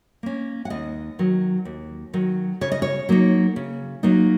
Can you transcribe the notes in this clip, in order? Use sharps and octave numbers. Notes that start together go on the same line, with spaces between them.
A#3 C#4
F#5
D#2 D#5
D#3 F#3
D#2
D#3 F#3
C#3 C#5
D#5
C#5
F#3 A#3 D#4
C#3
F#3 A#3 D#4